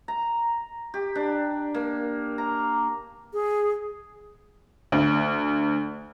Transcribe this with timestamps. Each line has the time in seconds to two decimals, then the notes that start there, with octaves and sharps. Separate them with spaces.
0.08 A#5
0.94 G4
1.15 D4
1.74 A#3
2.38 A#5
3.33 G#4
4.92 D2